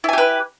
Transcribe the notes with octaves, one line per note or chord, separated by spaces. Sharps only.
E4 G4 B4 G#5